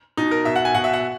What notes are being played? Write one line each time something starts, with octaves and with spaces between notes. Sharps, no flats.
B2 D#4
A#4
B2 E5
F#5
G#5
B2 F#5
E5
F#5